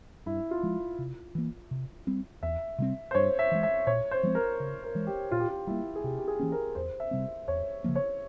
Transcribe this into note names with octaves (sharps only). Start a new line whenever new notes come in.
G2 E4
F4
F3 G#3
C3
E3 A#3
C3
G3 C4
E2 E5
C3 G3 C4
C5
G2 C#5
E5
E3 G#3
E5
A#2 C#5
C5
F3 G#3 C4
A#4
C#3
A#4
E3 G#3
G4
A#2 F4
G4
F4
G3 A#3 E4
G#4
C3 G4
G4
G#4
E3 A#3 C#4
A#4
E2 C5
E5
C3 G3 C4
E2 C#5
C#3 F3 A#3
C#5